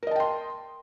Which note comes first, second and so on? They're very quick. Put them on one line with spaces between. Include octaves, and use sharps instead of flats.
A#4 D#5 A5 G5 C6